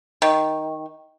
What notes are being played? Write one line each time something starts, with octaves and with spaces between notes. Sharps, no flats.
D#3